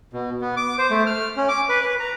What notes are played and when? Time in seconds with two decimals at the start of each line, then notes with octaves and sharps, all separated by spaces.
0.13 B2
0.41 B3
0.57 D6
0.78 C5
0.91 A3
1.07 F6
1.37 C#4
1.49 D6
1.69 B4
1.82 B4
1.99 A#5